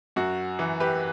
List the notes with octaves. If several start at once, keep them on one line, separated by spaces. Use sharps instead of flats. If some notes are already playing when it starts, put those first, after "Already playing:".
F#2 F#4
E3
G4 B4